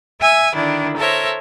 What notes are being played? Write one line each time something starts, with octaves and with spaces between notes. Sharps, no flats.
E5 G#5 E6
D3 D#3 D4 E4
A4 A#4 C5 C#5 E5